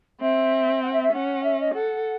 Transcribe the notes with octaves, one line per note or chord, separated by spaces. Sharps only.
C4 E5
F#5
E5
E5
C#4 F#5
E5
D#5
A4 F#5